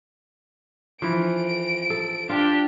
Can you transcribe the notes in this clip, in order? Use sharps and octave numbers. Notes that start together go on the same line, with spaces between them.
E3 F3 D7
A4
D4 F4 G4 G5